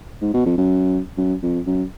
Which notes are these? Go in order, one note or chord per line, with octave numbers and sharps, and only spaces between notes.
G#2
B2
F2
F#2
F#2
F2
F#2